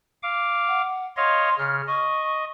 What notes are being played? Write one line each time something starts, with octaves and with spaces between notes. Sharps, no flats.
F5 D6
F#5
C#5 D#5 F5 C6
C#3 F6
D#5 C#6